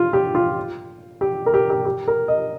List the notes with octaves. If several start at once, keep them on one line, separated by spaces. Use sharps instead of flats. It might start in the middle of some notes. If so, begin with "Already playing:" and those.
Already playing: F4
G4
F4
G4
A#4
G4
G4
G4
A#4
D#5